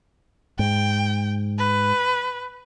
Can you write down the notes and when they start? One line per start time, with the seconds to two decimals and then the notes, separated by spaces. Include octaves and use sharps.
0.59 G#2 G5
1.59 B4